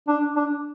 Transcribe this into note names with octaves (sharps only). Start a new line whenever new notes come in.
D4
D4